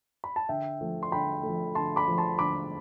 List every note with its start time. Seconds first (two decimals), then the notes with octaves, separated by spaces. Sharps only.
0.24 B5
0.36 A5
0.49 D3 E5 G5
0.81 F3 A3
1.03 C6
1.12 D3 G5 B5
1.43 F3 A3
1.75 D3 A5 C6
1.96 B5 D6
2.07 F3 A3
2.18 A5 C6
2.39 D3 B5 D6